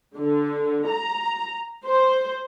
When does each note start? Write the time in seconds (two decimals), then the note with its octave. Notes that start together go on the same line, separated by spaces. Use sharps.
0.16 D3
0.86 A#5
1.84 C5